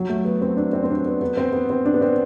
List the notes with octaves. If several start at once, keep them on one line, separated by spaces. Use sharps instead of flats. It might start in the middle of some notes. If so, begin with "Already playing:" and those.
Already playing: F#3
A3
B3
C4
D4
C4
C4
D4
B3
B3
C4
B3
C4
D4
B3
C4